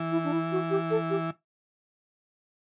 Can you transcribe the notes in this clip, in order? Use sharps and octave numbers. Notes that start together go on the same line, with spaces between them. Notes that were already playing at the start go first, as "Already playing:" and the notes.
Already playing: E3
E4
D4
E4
F#4
G4
A4
G4